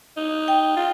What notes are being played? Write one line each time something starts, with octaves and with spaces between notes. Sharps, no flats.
D#4
G5
F4